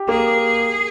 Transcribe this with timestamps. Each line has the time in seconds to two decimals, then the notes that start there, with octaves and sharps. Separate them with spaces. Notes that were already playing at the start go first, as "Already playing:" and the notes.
Already playing: G4
0.08 A#3 G#4